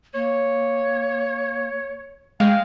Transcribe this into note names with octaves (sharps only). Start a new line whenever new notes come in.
A#3 C#5
G#3 F5 G5